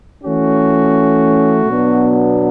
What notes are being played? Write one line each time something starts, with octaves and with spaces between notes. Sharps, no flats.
E3 A3 C#4 F#4
B2 F#3 B3 D4